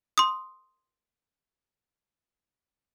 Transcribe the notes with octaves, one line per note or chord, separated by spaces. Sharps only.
C6 D#6